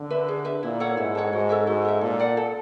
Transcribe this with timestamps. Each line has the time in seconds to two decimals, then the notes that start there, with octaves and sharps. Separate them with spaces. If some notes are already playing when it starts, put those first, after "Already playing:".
Already playing: D3
0.10 B4 E5
0.28 G#4
0.45 B4 E5
0.63 A#2 E4
0.80 A4 C#5 F#5
0.97 G#2 E4
1.15 A4 C#5 F#5
1.33 G#2 F#4
1.49 A4 C#5 E5
1.67 G#2 F#4
1.85 A4 C#5 E5
2.01 A#2 A4
2.20 D5 F#5
2.37 A4